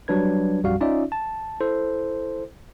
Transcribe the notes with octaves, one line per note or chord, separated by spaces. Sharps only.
F#3 G3 D4 B4 G#6
A#1 F#2 G3 F#4 F5
C#4 D#4 F4 D5 E5
A5
E4 A4 C5